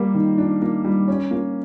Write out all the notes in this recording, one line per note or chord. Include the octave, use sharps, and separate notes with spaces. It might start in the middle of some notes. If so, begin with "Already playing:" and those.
Already playing: G3 A#3
D#3
D4
A#3
G3
C#4
A#3